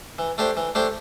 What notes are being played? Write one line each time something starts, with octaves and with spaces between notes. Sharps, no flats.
E3
A3 D4 G4 C5
E3
A3 D4 G4 C5